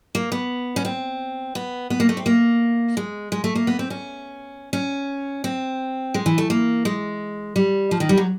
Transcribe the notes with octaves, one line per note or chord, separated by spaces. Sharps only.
A#3
B3
C#4
C4
B3
B3
A#3
A3
C4
A#3
G#3
G#3
A3
A#3
B3
C4
C#4
C#4
C4
G#3
E3
A3
A#3
G#3
G3
F3
D#3
G3
F#3